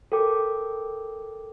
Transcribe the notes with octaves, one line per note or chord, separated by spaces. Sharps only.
A4 A#4 G5 D6